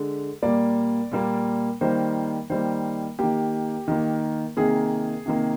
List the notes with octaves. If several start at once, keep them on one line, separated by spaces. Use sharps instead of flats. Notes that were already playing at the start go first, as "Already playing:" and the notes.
Already playing: D3 G#3
A#2 G3 A#3 D5
A#2 G3 A#3
D#3 G3 A#3 C5
D#3 G3 A#3 C5
D#3 A#3 G4
D#3 A#3
C3 D#3 A#3 G#4
C3 D#3 A#3